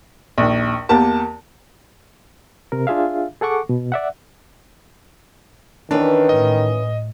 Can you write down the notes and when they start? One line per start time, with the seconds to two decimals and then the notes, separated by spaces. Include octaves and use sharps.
0.38 A#1 D#2
0.89 E2 A#3 G4 A#4 A5
2.72 C3 A#4
2.87 D4 F4 G#4 E5 F5
3.41 G#4 A4 F#5 C#6 D6
3.69 B2
3.92 D5 E5 F#5
5.91 D#3 E3 C#4 D4 B4
6.29 A2 D#5